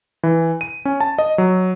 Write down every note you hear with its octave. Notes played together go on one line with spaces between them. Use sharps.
E3
D#7
C#4
A5
D#5
F#3